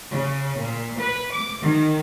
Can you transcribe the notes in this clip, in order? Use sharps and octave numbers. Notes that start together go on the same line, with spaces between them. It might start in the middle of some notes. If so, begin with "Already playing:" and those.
C#3
A#2
B4
D6
D#3